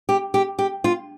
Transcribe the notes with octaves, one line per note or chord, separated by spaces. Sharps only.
G4
G4
G4
F4